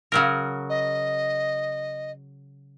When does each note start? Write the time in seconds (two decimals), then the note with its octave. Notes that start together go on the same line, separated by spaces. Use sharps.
0.12 C#3 F#3 A#4
0.69 D#5